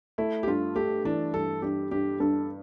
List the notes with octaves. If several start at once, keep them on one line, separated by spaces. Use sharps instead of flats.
A3 E4
G4
G2 F4
A3 G4
E3 D4
G2 A4
G2 G4
G2 G4
G2 A4